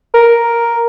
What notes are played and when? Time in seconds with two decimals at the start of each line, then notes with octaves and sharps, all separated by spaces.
0.14 A#4